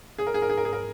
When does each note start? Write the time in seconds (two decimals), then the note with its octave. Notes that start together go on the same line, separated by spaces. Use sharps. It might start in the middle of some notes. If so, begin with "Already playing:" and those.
0.19 G#4
0.27 A#4
0.34 G#4
0.42 A#4
0.50 G#4
0.57 A#4
0.65 G#4
0.73 A#4